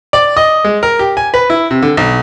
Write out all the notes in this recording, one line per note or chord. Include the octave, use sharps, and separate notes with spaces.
D5
D#5
G#3
A#4
G4
G#5
B4
E4
C3
D3
B1